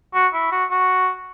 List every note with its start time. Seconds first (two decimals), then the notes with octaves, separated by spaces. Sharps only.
0.14 F#4
0.33 E4
0.52 F#4
0.70 F#4